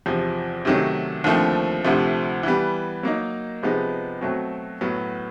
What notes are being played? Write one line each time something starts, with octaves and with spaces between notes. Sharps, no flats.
E2 C3 F3
C3 D#3 F#3 A3 C#4
D#2 D3 F3 A3 C4
D2 C3 F3 A3
E3 G3 B3
F#3 A#3 D#4
C3 F3 G#3 B3 D#4
B2 F#3 A3 C4
A2 F#3 B3